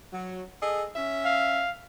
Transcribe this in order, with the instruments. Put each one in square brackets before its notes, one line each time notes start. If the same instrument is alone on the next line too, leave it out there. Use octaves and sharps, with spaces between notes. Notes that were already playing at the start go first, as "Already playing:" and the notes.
[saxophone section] F#3
G#4 A4 D#5
C#4 E5
[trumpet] F5